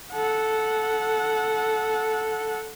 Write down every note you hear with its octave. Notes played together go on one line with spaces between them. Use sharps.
A4 F#5